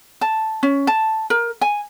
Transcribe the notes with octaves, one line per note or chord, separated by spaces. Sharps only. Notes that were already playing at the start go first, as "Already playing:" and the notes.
A5
C#4
A5
A#4
G#5